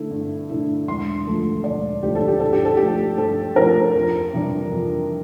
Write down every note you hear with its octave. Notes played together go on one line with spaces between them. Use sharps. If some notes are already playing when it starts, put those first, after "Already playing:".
Already playing: D3 A3 E4
G2
D3 A3 E4
E1 C6
D2 D3 F3 A3
E1 D5
D2 D3 F3 A3 G4
A4
G4
G2 A4
G4
A4
F3 A3 G4
G2 A4
F3 A3 A#4
F2
C3 E3 G3 D4
F2